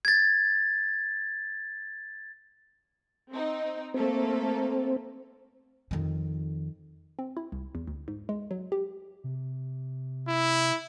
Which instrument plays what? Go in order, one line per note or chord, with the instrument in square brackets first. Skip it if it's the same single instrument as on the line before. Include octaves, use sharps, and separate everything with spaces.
[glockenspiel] G#6 A6
[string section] C4 D#4
[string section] A3 A#3 A4 [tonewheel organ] C4
[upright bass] F2 D#3
[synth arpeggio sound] C4
E4
C2
E2
D2
G#2
G#3
F#3
G4
[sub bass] C3
[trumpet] E4